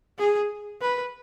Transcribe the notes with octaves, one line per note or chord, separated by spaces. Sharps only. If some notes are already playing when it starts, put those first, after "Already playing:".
G#4
B4